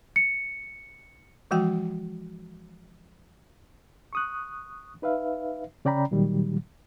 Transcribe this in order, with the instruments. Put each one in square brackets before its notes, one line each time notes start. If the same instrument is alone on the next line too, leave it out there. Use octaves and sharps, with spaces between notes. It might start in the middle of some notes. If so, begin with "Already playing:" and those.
[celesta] C#7
[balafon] E3 F3 G#3 F#4 G5
[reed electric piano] C#6 D#6 F#6
D#4 B4 E5 F5
C#3 C#4 D5 G5 A#5 B5
A#2 D#3 F#3 G3